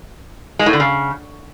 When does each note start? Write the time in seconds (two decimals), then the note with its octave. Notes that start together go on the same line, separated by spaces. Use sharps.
0.59 G#3
0.66 A2
0.73 D3
0.80 C#3